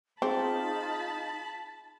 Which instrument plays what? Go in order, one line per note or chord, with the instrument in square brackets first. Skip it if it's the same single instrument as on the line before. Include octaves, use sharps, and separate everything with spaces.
[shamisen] C4 [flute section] D#4 F4 [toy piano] G#4 [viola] A5 B5